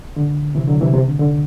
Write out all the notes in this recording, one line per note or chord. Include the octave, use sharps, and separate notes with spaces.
D3
C3 E3
D3 F#3
C3 E3
C3
D3
D3